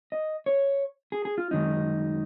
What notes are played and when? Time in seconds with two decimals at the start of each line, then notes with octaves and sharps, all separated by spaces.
0.12 D#5
0.46 C#5
1.12 G#4
1.25 G#4
1.38 F4
1.51 F#2 D#3 G#3 D#4